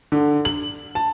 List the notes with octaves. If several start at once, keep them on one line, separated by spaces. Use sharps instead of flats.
D3
F#7
A5